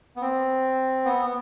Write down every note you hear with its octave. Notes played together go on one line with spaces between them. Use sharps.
B3
C4
B3
B3